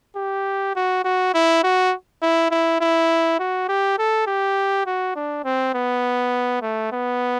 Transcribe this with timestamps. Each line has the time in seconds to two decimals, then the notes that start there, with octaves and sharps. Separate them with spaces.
0.16 G4
0.76 F#4
1.04 F#4
1.34 E4
1.63 F#4
2.22 E4
2.51 E4
2.81 E4
3.39 F#4
3.69 G4
3.98 A4
4.27 G4
4.86 F#4
5.16 D4
5.45 C4
5.74 B3
6.62 A3
6.92 B3